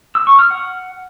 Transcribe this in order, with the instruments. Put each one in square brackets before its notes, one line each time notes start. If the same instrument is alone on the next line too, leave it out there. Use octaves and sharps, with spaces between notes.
[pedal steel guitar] E6
C#6
F6
F#5